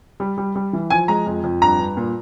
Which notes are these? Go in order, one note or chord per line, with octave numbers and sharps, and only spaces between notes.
G3
G3
G3
E3
F3 G#5
G#3 A#5
F2
F2
G2 A#5
G2
A#2